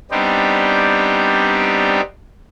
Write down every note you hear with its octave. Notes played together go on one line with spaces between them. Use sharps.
G3 B3 C4 D4 D#4 G4